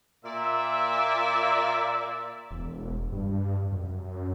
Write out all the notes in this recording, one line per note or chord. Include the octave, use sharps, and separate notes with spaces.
A#2 D5 E5
E1
G2
F#2